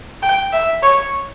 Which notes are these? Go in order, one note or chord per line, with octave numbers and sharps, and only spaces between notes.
G5
E5
C#5